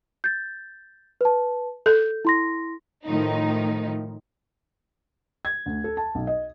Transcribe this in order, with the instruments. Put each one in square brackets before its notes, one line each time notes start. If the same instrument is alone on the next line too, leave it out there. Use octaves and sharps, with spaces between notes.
[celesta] G6 A6
B4 A5
[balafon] A4 [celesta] G6
[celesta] E4 C6 A#6
[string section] A2 D#3 F3 D#4
[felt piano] G#6
D2
A4
A5
B1
D#5